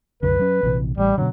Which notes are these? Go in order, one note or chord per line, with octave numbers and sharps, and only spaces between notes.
C2 F#2 D3 B4
F#3 C#4
A#1 C3 E3
A1 G3
B2 D3 F#3